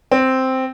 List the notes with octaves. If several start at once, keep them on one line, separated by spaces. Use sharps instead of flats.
C4